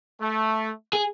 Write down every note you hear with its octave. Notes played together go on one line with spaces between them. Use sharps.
A3
G#4